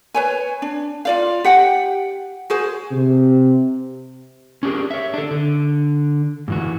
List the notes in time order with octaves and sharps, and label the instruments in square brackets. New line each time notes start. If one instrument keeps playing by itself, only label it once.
[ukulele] B4 C#5 G#5
D4
F4 D5 F5
G4 F#5 G5
F#4 G#4 C5
[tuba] C3
[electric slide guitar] C#4 D4 G4 G#4 A#4
C#5 E5
D4 A4
D3
G#2 E3 F#4